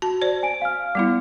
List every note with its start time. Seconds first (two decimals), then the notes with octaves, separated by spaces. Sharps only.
0.02 F#4 A5
0.22 C5 D5
0.43 G#5 D7
0.62 F5 F6
0.95 G3 B3 E4